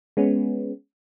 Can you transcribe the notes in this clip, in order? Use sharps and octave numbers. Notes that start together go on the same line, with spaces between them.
G#3 B3 C#4